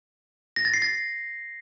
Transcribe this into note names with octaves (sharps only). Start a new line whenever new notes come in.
A#6
A6
C7
A6